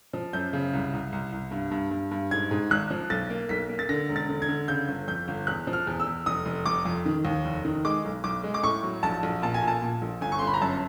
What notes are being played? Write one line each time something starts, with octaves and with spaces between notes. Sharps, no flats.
F3
F#2 G6
C#3
C2
C2
C2
C2
G2
G2
G2
G2
G#2 G#6
G#2
G#1 F#6
F3
B1 A6
A#3
B1 B6
A#3
A6
D3 A#6
E1
A6
D3
G#6
D3
C#3 G6
G1
F2 G6
G1
E2 F#6
F3
F6
E2
E6
E2
F1 D#6
F1
F1 D6
F2
D#3
D#2
F1
D#3
G#3 D6
B1
B1 D6
G#3
D6
A2 C#6
F#3
A#1 A5
A#1
A#2 A5
G#5
A#2
A5
A#2
A#1
G1 G#5
C#6
C6
G1
B5
A#5
F#2 A5